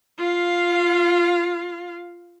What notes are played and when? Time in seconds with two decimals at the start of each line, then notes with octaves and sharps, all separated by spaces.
0.18 F4 F5